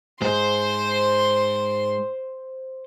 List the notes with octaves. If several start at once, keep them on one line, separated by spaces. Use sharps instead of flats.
G#2 C5 C6